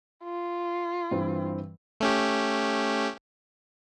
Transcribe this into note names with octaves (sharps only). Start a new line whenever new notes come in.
F4
G2 E3 C4
A3 C#4 G4